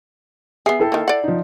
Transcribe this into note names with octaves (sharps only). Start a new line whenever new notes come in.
B3 G#4 E5 C7
E4 A4 G5
D#3 A#3
D5 F#5
F3 D#4